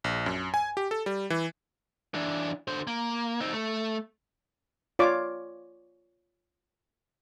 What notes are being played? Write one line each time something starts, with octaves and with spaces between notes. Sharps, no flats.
A#1
F#2
G#5
G4
A4
G3
E3
E3 D4
D3 C5
A#3
C4 D#4
A3
F4 C#5 D5 D6